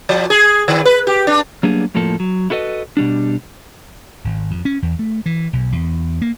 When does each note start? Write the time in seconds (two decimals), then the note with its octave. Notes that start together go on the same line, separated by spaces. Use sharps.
0.09 F3
0.30 G#4
0.68 D#3
0.85 B4
1.07 G4
1.27 D4
1.63 F#3 G3 A#3 B3 D4 G#4
1.95 F2 A2 F3 A#3 A4
2.20 F#3
2.50 E4 F#4 A4 B4 D#5
2.97 B2 G3 D4
4.24 G#1
4.51 F2
4.65 C#4
4.82 E2
4.99 A3
5.26 E3
5.53 B1
5.72 E2
6.22 A#3